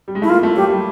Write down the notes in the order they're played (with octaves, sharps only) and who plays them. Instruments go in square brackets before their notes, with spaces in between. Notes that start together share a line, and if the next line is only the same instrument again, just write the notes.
[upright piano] G3
G#3
[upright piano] A3 [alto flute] E4
[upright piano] A#3 [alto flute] F4
[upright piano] A3
[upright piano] F#3 [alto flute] G4
[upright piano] G3